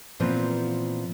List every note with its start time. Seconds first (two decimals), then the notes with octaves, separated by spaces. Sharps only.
0.20 A#2 E3 F3 B3 C4